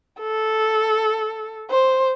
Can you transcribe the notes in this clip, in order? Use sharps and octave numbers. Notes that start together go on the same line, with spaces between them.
A4
C5